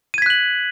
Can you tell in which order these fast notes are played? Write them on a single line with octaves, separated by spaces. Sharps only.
D#7 G#6 B6 F#6 F#7